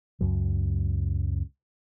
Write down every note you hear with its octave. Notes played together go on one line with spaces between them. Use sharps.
C#2 F#2 F#3